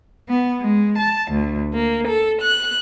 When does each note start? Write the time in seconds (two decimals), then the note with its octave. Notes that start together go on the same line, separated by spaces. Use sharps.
0.29 B3
0.62 G#3
0.99 A5
1.32 D2
1.74 A#3
2.07 A4
2.42 F#6